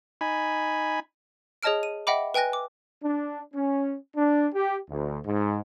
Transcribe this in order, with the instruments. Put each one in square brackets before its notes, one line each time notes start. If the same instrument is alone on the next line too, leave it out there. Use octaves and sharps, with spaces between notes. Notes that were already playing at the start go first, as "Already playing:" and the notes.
[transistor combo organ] D#4 G#5 B5
[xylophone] G#4 C#5 D#5 A5 F6 D7
D#7
D#5 E5 F#5 G5 B5 D6
B4 G5 G#5 F#6 A#6
D6
[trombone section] D4
C#4
D4
G4
D2
G#2